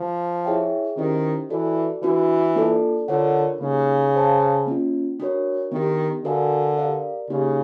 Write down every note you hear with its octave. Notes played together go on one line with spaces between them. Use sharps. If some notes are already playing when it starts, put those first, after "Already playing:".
Already playing: F3
E4 G#4 C#5 E5 G5
D#3 C#4 E4 G4 C5 D#5
E3 F#4 A4 D5
E3 D4 F#4 B4
A#3 D4 F4 A4 D5
D3 F4 A#4 C#5 F#5
C#3 A#3 D#4 G4
G#4 C5 F5 A5
A#3 C#4 F4
D4 F#4 A#4 C#5
D#3 B3 D4 G4
D3 F#4 A#4 D5 F5 G#5
G4 A#4 D5 F5
C#3 A#3 D#4 G4